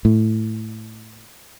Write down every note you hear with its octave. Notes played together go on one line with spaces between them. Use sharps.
A2